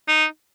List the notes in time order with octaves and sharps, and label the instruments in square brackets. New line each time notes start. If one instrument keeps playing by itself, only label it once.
[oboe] D#4